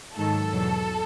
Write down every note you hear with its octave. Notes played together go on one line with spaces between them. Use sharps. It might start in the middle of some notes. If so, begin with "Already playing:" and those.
G#2 D#3 F#3 A4
E2 B2 F#3